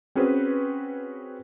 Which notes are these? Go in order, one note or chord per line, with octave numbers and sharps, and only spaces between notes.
C4 C#4 F#4 G#4 B4 C5